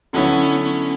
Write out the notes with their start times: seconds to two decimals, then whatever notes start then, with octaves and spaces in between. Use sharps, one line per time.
0.13 D3 F#3 B3 C#4 E4
0.63 C#4